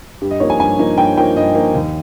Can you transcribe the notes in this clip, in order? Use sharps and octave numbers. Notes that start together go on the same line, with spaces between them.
G2 G4
D#5
F3 A#3 D#4 C#5
G#5
G2 G#5
F3 A#3 D#4
G2 G5
F3 A#3 D#4 G5
G2 D#5
F3 A#3 D#4
D#2